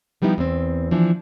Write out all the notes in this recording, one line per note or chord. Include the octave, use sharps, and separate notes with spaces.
F3 G3 B3 D#4 E4
E2 C4
E3 F3 D4